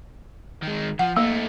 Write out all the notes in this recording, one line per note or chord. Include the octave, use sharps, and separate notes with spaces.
D#3 G#3
F3 F#5
A3 A#3 D#4